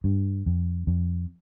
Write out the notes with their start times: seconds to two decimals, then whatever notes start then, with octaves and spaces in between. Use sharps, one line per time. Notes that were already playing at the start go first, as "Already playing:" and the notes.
0.04 G2
0.46 F2
0.87 F2